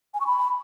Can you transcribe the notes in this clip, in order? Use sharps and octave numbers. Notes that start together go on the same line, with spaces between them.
G#5
C#6
B5